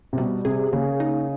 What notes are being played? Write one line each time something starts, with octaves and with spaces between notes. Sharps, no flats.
C3
B2 G3
C3 G#4
C#3 A#3
D#4